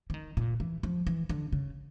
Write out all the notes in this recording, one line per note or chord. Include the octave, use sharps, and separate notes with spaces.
E3
D#3
A#2
E3
F3
E3
D3
C#3